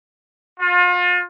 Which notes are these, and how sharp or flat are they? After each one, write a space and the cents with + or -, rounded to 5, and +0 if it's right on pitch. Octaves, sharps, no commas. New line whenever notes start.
F4 +35